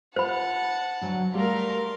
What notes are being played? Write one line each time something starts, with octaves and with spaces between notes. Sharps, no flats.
F4 C5 F#5 A5 B5
D2 F#3 G#5
G3 A3 G4 A4 A#4 F5 C6